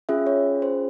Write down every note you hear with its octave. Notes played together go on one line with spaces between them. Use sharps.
C#4 F4 G#4 E5
C#5
C5